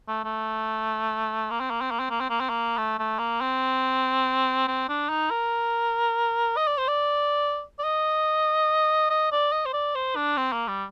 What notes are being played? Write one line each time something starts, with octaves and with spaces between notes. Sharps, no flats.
A3
A3
A#3
C4
A#3
C4
A#3
C4
A#3
C4
A#3
C4
A#3
A3
A3
A#3
C4
C4
D4
D#4
A#4
D#5
D5
C5
D5
D5
D#5
D#5
D5
D#5
C5
D5
C5
D4
C4
A#3
G3